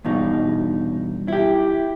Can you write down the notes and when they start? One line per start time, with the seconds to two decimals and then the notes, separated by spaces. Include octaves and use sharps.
0.05 E2 G2 B2 D#4
1.28 E4 G4